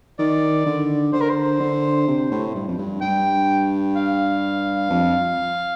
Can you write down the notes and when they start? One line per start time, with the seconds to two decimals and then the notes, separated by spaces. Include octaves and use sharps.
0.19 D#3 D5
0.66 D3
1.13 D3 C5
1.21 A#4
1.30 C5
1.60 D3
2.07 C3
2.31 A2
2.55 G2
2.68 F2
2.78 G2
3.01 G2 G5
3.96 F5
4.90 F2